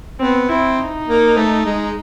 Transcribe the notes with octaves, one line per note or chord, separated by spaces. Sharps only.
B3 C4
C4 E4
D#4
A#3
A3
G#3